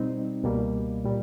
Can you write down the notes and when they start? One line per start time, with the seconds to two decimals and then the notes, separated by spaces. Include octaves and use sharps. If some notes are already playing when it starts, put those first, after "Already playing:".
Already playing: B2 G3 C4 D#4
0.43 C#2 B2 G3 A#3
1.04 A#2 G3